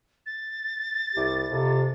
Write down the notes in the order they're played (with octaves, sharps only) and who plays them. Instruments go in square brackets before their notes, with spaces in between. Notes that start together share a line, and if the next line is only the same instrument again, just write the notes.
[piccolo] A6
[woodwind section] C2 G4
F2 C3